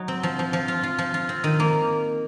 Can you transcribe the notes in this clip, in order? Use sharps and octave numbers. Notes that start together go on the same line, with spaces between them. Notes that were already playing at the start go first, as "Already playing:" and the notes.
Already playing: F#3 D#4
C4
F3
F3
F3
F4
F4
F3
F4
C4
D#3
A#3